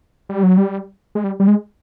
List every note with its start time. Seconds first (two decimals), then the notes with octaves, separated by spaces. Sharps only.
0.29 G3
0.43 F#3
0.57 G3
1.15 G#3
1.24 G3
1.40 G3
1.47 G#3